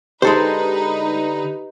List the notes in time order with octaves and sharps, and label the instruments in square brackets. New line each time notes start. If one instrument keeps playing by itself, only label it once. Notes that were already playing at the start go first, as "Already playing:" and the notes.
[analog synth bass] D3 [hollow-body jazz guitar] G#3 A4 C5 [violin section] D#4 B4 [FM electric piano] G4